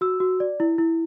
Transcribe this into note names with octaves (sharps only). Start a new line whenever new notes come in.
F#4 E6
F#4
D5
E4
E4